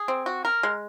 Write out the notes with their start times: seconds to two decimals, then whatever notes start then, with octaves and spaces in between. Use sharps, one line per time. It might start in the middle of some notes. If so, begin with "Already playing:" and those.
Already playing: G#4
0.08 C4
0.26 F#4
0.45 A#4
0.63 G#3